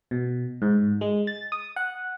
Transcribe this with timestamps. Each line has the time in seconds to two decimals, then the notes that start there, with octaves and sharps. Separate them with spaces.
0.11 B2
0.62 G#2
1.01 G#3
1.27 A6
1.52 D#6
1.76 F#5